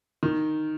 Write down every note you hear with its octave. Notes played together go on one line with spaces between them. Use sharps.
D#3